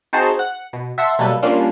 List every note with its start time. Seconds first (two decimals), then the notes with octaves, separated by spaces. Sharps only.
0.13 C4 D#4 F#4 G#4 C5 A5
0.39 F#5
0.73 B2
0.98 E5 F#5 A5 C6 E6
1.19 B2 F#3 G3 A#3 A4 B4
1.43 G3 A#3 C#4 D4 F4